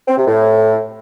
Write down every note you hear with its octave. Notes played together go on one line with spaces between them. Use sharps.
C4
C3
A2